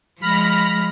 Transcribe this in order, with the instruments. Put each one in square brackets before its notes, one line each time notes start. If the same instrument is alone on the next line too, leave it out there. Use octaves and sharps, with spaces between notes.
[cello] F3 G#3 [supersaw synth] B5 F6 A#6